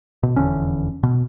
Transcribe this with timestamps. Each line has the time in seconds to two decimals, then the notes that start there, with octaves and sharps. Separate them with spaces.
0.23 B2
0.36 F1 E2 D3 C#4
1.03 B2